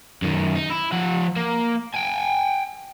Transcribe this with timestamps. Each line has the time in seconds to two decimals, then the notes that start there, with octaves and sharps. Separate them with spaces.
0.22 F#2 D#3
0.55 D#4
0.70 E4
0.93 F3 F#5
1.36 A#3
1.94 G5 G#5